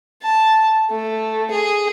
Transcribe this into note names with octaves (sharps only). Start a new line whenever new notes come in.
A5
A3
G#4